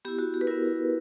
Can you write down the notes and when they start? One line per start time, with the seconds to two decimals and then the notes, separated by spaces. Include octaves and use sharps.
0.05 B3 E4 G4
0.19 F#4
0.34 G4
0.41 B4
0.47 B3 E4 A#4